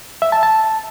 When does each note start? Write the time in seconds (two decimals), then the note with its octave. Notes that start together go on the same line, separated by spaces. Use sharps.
0.22 E5
0.32 A5
0.43 A5